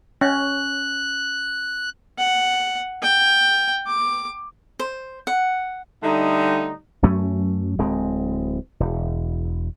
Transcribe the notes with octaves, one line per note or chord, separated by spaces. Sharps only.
C#4 F#6
F#5
G5
D6
C5
F#5
D3 G3 A3 D#4
F#2 F#3 A3 C#4
D1 G#3 C4
E1